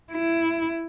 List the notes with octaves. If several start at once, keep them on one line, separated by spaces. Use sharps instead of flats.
E4